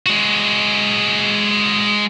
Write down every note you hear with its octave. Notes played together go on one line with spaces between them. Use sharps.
G#3 F#4